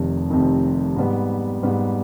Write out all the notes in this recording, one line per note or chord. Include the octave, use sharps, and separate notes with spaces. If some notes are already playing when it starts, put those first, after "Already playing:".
Already playing: F1 F2 C3 D#3
F1 F2 C3 D#3
G#2 G3 B3
G#2 G3 B3